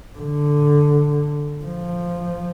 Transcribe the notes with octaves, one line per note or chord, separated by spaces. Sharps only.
D3
F3